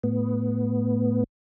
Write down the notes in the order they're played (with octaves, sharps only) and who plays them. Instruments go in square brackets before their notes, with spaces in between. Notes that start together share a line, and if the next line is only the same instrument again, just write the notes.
[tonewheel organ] A2 B3